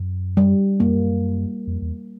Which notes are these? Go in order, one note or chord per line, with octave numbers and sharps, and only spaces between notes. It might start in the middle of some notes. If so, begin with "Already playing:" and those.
Already playing: F#2
G3
F#2 A#3
F2
F#2
F2
E2